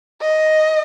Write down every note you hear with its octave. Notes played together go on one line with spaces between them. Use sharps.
D#5